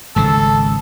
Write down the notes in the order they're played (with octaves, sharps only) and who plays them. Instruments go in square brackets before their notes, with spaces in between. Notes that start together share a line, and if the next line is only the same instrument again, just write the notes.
[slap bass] G#1 C#2 C#3 [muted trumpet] A4